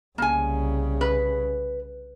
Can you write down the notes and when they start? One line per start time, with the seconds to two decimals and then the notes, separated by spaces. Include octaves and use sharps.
0.18 C2 C#3 A#3 G#5
1.01 B4